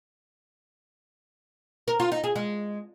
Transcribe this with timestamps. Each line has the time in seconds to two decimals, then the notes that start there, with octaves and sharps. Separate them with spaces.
1.88 A#4
2.00 F4
2.12 D#4
2.24 G#4
2.36 G#3